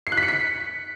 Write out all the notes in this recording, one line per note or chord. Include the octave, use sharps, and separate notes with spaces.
C7
F#6
B6
C#7
B6